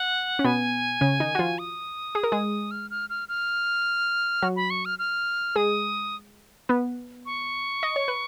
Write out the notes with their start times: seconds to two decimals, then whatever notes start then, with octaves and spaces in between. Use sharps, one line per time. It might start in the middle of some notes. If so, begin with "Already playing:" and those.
Already playing: F#5
0.39 C#4
0.45 B2 B3 G#5
1.01 C#3 C#4
1.20 D#3 D#4
1.35 F#4
1.39 F3 F4
1.59 D#6
2.15 G#4
2.23 A#4
2.32 G#3 G#4
2.71 F6
2.90 F6
3.10 F6
3.29 F6
4.42 F#3 F#4
4.56 B5
4.70 C#6
4.85 F6
4.99 F6
5.56 G#3 G#4 D#6
6.69 B3 B4
7.26 C#6
7.83 D#5
7.96 C#5
8.08 B4